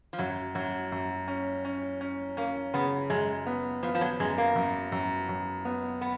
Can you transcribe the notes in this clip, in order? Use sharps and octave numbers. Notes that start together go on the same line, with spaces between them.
F3
F#2 F#3
F#2 F#3
F#2
C#4
C#4
C#4
A#3 C#4
C#3 B3
F#2 G#3
B3
F3 B3
F3
F#3
F#2 G#3
A#3
F#2
F#2
F#2
B3
B3